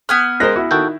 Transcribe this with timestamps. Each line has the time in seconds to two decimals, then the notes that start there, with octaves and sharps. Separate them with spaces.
0.09 B3 G#5 F6
0.40 G#3 A#4 C5 F#6 A#6
0.56 E4 F#4
0.71 D#3 F#4 A4 G5